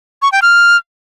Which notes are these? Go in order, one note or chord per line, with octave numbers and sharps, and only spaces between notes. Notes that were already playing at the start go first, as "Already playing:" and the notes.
C#6
G5
F6